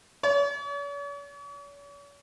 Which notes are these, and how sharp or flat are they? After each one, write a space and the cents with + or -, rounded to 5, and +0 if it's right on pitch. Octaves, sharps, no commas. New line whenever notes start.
C#5 +45